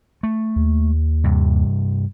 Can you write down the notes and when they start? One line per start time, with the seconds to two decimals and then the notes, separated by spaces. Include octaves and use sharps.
0.23 A3
0.56 D#2
1.24 G2 C3